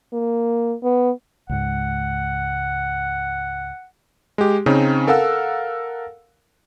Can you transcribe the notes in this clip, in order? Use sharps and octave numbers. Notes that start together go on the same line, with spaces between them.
A#3
B3
C#2 G#2 F#5
G#3 G4
C#3 C4 C#4 D#4
A4 A#4 F5 F#5 E6